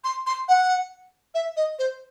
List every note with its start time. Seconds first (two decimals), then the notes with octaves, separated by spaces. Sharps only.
0.04 C6
0.27 C6
0.48 F#5
1.34 E5
1.57 D#5
1.79 C5